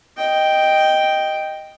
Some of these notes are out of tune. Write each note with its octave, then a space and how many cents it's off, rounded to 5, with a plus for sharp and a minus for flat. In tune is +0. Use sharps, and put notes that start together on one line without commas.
D#5 +0 G5 +0